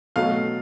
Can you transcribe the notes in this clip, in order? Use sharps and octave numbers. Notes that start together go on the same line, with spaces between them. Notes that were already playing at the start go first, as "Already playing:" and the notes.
B2 F#3 A3 F5